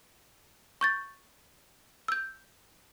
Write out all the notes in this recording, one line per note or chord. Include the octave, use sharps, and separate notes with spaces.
C#6 G6 A6
E6 G6